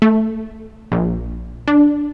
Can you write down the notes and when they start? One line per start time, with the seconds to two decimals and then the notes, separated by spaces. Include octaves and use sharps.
0.02 A3
0.92 A#1
1.68 D4